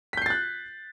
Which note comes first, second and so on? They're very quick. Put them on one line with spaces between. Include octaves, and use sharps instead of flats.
B6 G6 C7 A6 F#6